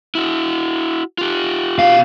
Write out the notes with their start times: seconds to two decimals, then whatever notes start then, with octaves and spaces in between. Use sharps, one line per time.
0.15 E4 F#4
1.18 F4 G4
1.79 B2 F5